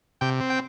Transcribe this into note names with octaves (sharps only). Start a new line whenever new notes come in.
C3 G5
C4
G5